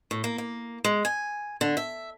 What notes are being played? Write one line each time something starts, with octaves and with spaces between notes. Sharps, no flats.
A2
A#3
A#3
G#3
G#5
D3
E5